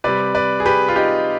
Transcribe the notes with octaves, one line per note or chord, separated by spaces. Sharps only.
C3 G3 B4 D5
B4 D5
G#4
G4 B4
F4
D#4 G4